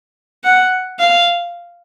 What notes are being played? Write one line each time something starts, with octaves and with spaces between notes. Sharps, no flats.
F#5
F5